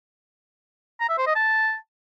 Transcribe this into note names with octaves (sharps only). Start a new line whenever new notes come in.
A#5
E5
C5
D#5
A5